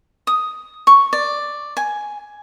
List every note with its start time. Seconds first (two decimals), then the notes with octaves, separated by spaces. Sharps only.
0.27 D#6
0.87 C#6
1.13 D5
1.77 G#5